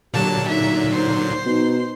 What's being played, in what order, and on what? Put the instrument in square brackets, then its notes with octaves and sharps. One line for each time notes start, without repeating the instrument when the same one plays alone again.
[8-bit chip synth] A#2 D3 F#3 [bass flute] G4 [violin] A5
[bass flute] D#4 [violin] E5
[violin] C5 C6
[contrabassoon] B2 [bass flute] D#4